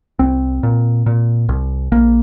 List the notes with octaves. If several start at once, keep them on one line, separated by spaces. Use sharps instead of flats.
C2 C4
A#2
A#2
C2
A#1 A#3